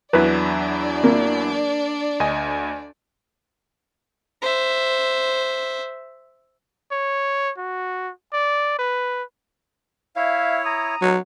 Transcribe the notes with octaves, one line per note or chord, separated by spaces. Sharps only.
E2 F#3 D4 E4 B4 D5
A#3
D2 D#5 G#5
C5 E5
C#5
F#4
D5
B4
E4 C#5 E5 F5
A#5 D#6
F#3